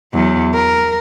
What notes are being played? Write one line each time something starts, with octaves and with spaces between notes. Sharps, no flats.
E2 F#3
A#4